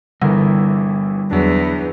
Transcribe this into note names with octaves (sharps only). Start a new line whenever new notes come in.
G1 D3 E3 G3 E4 A#4
E2 F#3 D4